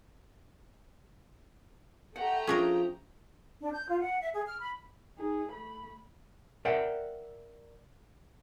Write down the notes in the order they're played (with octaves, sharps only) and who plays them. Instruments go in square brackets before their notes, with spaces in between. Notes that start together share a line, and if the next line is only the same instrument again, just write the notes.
[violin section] A3 G4 A#5 [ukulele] F#5
[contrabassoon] F3 [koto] C#4 D4 A#4 [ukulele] G#4
[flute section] D4
G6
F4
F#5
E5
G#4
F6
B5
[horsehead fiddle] D#4 G#4
A3 B5
[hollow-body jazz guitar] A#4 D5 E5 F#5 G5